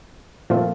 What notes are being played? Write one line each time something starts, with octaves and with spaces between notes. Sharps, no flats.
A#2 F3 A3 C4 F4